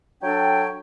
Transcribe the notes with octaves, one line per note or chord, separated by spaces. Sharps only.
F#3 D4 A4 C#5 G5